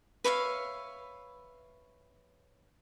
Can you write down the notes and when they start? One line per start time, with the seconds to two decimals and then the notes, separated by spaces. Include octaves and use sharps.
0.24 B4 C#5 E5 F5